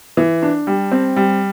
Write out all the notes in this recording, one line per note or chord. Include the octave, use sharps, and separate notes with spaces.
E3
D4
G3
C4
G3